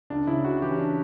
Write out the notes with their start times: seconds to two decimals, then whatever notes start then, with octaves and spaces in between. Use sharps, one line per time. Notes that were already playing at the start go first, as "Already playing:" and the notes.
0.10 C#2 D4
0.27 C#3 E4
0.44 C#2 F#4
0.62 E3 G4
0.71 C#4
0.79 D4